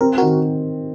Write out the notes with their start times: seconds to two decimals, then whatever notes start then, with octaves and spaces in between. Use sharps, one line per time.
0.01 C4 A#4
0.18 D#3 F#4 A#4